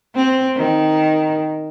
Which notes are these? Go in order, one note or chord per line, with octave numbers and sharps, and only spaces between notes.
C4
D#3